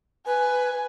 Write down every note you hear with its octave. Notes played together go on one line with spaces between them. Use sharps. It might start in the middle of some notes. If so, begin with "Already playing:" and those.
B4 G#5